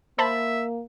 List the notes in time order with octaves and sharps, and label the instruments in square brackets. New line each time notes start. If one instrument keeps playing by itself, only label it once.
[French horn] A#3 [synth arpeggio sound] C5 A5 B5 [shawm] E5